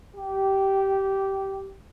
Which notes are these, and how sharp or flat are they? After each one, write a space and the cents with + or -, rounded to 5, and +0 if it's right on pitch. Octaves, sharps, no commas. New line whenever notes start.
G4 -15